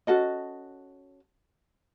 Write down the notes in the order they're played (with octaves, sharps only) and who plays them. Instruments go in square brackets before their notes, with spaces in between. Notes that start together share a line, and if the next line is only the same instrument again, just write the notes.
[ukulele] C#4 F#4 A4 D#5